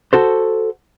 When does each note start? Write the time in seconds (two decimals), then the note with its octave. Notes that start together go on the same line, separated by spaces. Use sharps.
0.13 F#4 A4 C5